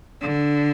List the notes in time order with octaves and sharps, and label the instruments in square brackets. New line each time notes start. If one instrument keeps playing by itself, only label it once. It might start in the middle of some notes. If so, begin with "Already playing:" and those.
[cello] D3